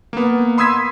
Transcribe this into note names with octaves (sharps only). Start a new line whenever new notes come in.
A#3 B3
B5 C6 D#6 E6 G#6 B6